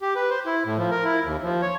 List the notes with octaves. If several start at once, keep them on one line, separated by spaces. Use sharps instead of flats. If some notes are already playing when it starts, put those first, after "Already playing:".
G4
B4
C5
E4
A2
F3
A#4
E4
D#2
F3
C#5